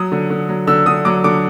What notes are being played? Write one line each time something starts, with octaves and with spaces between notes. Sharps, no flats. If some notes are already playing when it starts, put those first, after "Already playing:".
Already playing: F#3 D#6
D3
D3
F#3
D3 E6
D3 D#6
F#3 D6
D3 D6